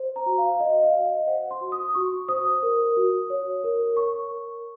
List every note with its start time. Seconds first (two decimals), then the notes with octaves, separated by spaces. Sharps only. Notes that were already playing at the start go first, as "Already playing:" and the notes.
Already playing: C5
0.16 A#5
0.26 F#4
0.38 F5
0.60 C5 D#5
0.83 F5
0.93 F#4
1.05 D#5
1.27 C5 F#5
1.51 C6
1.61 F#4
1.72 D#6
1.95 F#4 C#6
2.28 C5 D#6
2.63 A#4
2.97 F#4
3.30 C#5
3.64 A#4
3.97 C#5 C#6
4.31 A#4